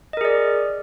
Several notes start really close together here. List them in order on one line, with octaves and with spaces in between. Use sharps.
D#5 A#4 G#4 D5